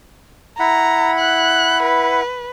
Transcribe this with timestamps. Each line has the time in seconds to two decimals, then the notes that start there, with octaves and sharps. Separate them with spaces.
0.59 E4 F#5 A#5 B5
1.20 F#6
1.84 B4